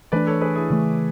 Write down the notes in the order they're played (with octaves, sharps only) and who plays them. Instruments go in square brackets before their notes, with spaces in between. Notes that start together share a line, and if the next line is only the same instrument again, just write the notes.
[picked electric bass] E3 A3 D4 [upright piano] B4 D5
[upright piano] A4 C#5
G#4 B4
E4 G#4
[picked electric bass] C#3 E3 A3